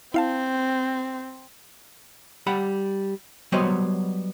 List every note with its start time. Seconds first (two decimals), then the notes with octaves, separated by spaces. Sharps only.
0.14 C4 E4 F5 A5
2.47 G3 F#5 B5
3.52 F#3 G3 B3 C5 C#5 D#5